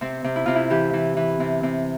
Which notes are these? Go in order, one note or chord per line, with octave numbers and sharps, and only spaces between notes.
C3 C4
C3
E4
C3 F4
E4
E3 G4
E3
E3
C3
C3